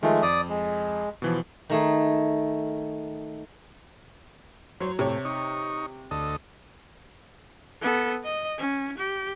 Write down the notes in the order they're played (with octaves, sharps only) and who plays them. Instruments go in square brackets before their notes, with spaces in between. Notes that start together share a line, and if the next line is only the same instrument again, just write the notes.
[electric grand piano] D#3 F3 F4 [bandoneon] G#3 A3
[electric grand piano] F2 [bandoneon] D5 D#6
[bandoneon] G#3
[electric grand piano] B2 E3 F3
[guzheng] D#3 A3 G#4
[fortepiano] F#3 C#5 [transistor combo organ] C5
[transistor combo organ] A2 [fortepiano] C3 C#5
[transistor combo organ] D#4 C#6
D2 A4 D#5
[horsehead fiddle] B3 A4
D#5
C#4
G4